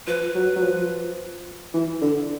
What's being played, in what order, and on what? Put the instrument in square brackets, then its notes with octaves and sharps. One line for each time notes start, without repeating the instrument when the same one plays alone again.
[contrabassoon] F3 [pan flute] B4
[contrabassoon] F#3
F#3
F3
E3
D3